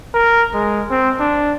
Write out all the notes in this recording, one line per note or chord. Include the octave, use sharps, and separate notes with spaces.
A#4
G#3
C4
D4